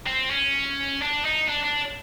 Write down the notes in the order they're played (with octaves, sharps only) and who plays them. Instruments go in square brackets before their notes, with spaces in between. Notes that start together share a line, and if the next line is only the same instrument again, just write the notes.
[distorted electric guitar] C4
C#4
D4
D#4
D4
D4